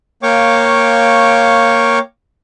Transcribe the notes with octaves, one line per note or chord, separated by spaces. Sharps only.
A#3 C#5 F5 G5 C#6 D6